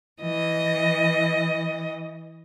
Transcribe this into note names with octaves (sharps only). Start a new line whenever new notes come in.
E3 D#5